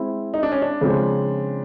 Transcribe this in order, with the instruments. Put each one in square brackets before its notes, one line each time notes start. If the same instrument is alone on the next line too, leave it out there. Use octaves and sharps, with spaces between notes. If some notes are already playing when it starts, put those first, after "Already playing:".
Already playing: [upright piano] G#3 C4 E4
[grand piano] D#4
D4
C#4
D4
[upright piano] C#3 F3 G#3 C4 F4